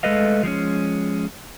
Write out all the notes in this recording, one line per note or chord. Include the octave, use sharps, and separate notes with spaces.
G#3 A3 A4 B4 D#5 F5
F3 G#3 A3 C#4